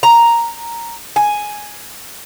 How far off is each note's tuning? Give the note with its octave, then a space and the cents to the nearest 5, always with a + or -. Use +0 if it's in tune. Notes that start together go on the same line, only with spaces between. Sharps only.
A#5 +0
G#5 +5